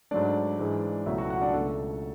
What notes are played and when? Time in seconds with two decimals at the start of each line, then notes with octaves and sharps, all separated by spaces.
0.11 G#2 F#3 A3 D4 D5
0.59 G#2 E3 G#3
1.06 C#2 B2 F#3 A3 E4 E5
1.18 F#4 F#5
1.30 F#4 F#5
1.42 D4 D5
1.54 C#2 B2 A3 A4